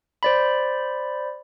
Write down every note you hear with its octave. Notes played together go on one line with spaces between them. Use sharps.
C5 D5 B5